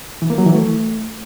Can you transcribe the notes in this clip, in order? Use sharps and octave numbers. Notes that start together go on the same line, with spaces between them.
E3
A#3
F#3
E3
A3